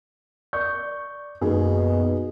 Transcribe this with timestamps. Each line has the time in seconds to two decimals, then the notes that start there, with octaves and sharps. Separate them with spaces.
0.53 D5 C#6 G6
1.41 F#2 B2 D#3 A#3 B3 G#4 B4